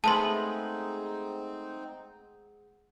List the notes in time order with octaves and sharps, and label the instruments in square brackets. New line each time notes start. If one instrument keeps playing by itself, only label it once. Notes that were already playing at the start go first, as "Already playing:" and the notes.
[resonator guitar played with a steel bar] G#3 B3 G#4 [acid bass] A3 [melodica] C4 D#4 [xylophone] A5 C6